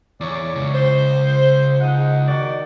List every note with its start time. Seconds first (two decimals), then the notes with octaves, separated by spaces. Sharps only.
0.21 E2 C#5 D5
0.55 C#2
0.74 C5
1.81 G#3 D#4 F#5
2.28 D#3 F#4 D5